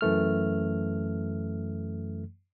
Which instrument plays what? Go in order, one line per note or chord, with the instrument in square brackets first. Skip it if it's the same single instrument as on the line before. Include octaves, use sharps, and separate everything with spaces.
[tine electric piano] F#2 E3 A3 F6